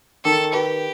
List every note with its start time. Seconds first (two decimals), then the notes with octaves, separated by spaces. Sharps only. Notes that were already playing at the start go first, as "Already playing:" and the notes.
0.24 D#3 A4
0.53 G4 B4